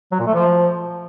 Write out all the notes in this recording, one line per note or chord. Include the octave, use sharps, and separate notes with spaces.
F#3
A#2
A3
F3